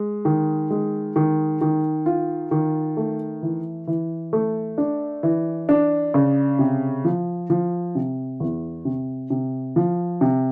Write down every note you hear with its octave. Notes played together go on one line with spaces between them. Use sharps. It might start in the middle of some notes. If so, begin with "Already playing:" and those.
Already playing: G#3
D#3
G#3
D#3
D#3
F4
D#3
A3
E3
E3
A3
D4
E3
D4
C#3
C3
F3
F3
C3
E2
C3
C3
F3
C3